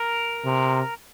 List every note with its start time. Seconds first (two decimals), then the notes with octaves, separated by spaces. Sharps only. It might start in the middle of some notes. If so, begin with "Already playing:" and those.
Already playing: A#4
0.45 C3